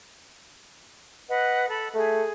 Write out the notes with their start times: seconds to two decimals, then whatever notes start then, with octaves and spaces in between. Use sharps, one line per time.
1.28 B4 D#5 F#5
1.69 A4 B5
1.94 A3 G#4